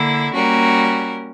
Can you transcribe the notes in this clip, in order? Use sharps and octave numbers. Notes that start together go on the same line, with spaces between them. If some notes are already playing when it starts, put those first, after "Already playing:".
Already playing: D3 A#3 E4
G3 A#3 C#4 F#4 A#4